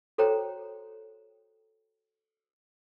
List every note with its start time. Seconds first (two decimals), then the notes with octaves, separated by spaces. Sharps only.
0.18 F#4 A4 C5 C#5 G5 A#5